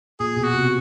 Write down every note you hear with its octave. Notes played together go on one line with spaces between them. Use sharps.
A#2 G#4
B2
F#4
C3